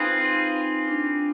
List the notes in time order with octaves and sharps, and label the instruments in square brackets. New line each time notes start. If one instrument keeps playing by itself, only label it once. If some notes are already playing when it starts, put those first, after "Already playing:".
Already playing: [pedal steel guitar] C4 F4 G#4 B4 [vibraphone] D#4
[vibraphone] D#4
D4